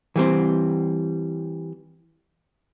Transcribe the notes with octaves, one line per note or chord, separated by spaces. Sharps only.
E3 G3 C4